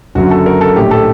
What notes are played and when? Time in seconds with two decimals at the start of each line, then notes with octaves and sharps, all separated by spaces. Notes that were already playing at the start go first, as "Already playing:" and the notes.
0.15 F#1 F#2 D3 F#4
0.31 A4
0.46 A#4
0.61 A4
0.76 A#1 A2 G4
0.91 A4